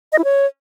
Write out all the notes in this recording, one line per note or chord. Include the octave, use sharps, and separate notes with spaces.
D#5
E4
C#5